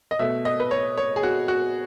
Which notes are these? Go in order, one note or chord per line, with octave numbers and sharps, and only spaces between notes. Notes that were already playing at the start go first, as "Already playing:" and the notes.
D#5
B2 A3 E5
D#5
B4
C#5
C#5
G#4
F#4
F#4